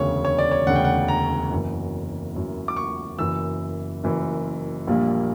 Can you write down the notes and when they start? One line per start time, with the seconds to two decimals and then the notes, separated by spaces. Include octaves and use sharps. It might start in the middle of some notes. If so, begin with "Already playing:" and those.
Already playing: E1 D2 C#3 C#5
0.25 C#5
0.38 D5
0.51 C#5
0.67 E1 D2 C#3 F#5
0.76 G5
0.84 F#5
1.08 A#5
1.51 F#1 F#2 E3
2.35 F#1 F#2 E3
2.68 D6
2.76 C#6
3.19 F#1 F#2 E3 E6
4.04 F#1 F#2 E3
4.87 A#1 A#2 G3 A#3